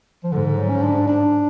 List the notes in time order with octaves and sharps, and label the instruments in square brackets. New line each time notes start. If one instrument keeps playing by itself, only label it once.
[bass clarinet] F3
[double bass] G#2 [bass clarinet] D3
[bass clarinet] D3
F#3
C#4
D4
D4